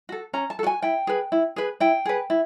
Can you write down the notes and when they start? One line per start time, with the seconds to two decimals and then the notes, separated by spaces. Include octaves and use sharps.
0.09 F#4 A4
0.33 C#4 A#5
0.50 A5
0.59 A4
0.63 F#4 G#5
0.82 E4 G5
1.07 G#4 B4
1.32 E4
1.56 G#4 B4
1.80 E4 G5
2.05 G#4 B4
2.30 E4